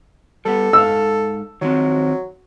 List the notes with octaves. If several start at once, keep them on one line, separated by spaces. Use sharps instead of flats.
G3 B3 A4
G#2 F5 E6
D#3 F3 F#3 C4